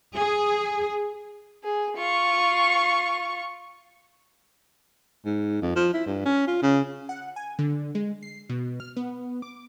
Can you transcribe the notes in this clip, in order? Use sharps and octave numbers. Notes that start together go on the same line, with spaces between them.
G#4
G#4
F4 C#6
G#2
F2
F3
E4
G2
C#4
F4
C#3
F#5
G#5
D3
G#3
C7
B2
F6
B3
D6